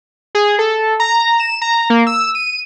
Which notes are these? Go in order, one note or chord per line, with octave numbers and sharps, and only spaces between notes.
G#4
A4
A#5
E7
A#5
A#3
E6
D#7